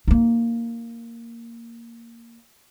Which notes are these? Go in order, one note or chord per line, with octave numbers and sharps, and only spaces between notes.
A#3 D#4